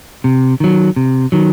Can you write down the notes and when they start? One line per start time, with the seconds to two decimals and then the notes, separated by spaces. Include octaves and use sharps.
0.24 C3
0.60 D#3 F#3
0.96 C3
1.32 D#3 F#3